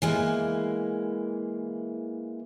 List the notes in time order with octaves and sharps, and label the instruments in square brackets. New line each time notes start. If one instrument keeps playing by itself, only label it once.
[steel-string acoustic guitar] E3 G#3 A#3